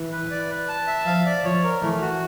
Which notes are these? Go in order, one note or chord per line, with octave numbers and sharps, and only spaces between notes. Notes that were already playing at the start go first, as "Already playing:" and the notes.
Already playing: E3
B4
D5
B4
A5
E5
F3 F5
D5
F3 C#5
A#4
E3 A3
F#4